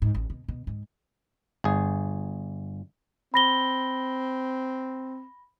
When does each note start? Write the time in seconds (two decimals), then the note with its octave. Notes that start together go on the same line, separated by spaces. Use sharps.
0.02 G#2
0.15 A1
0.30 B2
0.48 B2
0.67 G#2
1.64 G1 G#4
3.34 C4 B5 A#6 G7